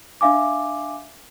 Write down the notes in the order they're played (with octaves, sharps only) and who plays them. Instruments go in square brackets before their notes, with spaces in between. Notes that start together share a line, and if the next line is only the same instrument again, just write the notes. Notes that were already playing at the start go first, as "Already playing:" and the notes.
[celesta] D4 E5 F5 G#5 D6